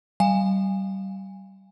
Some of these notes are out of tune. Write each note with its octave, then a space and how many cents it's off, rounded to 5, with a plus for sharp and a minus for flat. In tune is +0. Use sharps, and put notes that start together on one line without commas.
G3 -25 F5 +0 G#5 -20